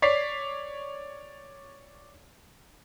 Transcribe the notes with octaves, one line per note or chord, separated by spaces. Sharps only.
C#5 D5 B6 C7